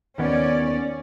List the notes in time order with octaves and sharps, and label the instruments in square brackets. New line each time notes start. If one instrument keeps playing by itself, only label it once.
[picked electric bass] D#2 D#3 B3 [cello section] C#4 D5